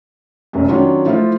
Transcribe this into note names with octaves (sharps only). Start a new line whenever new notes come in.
F1 F#2
D#3 F#3 C#4 D4 F4
F3 A3 E4 F4